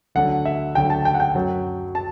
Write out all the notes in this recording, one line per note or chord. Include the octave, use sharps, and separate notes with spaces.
D2 D3 F#3 F#5
E5
D2 D3 F#3 G5
A5
G5
F#5
G5
F#2 F#3
A5